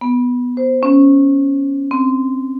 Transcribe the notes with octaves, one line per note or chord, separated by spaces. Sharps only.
B3
C5
C#4
C4